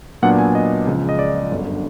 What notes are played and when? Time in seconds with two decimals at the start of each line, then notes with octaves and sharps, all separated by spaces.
0.22 A#2 F#3 B3 D4 F#5
0.38 G#5
0.55 D#5
0.87 C#2 C#3 F3
1.09 D#5
1.19 D5
1.51 G1 F#2 D3